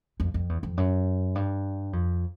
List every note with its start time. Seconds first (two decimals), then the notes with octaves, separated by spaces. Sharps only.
0.20 F2
0.34 F2
0.49 E2
0.63 F2
0.77 F#2
1.35 G2
1.93 F2